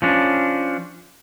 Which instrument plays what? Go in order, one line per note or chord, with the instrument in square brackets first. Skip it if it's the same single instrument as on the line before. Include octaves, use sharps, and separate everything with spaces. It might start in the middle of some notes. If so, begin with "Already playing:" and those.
[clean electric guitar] F3 C#4 D4